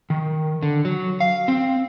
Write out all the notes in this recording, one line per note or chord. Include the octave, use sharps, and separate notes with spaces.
D#3
D3
F#3
F5
C4